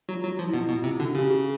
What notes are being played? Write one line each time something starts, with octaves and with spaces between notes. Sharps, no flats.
F#3 F4
F#3
F4
F3
E4
B2
B2 F4
C3 F4
D3 F#4
C#3 G4
G#4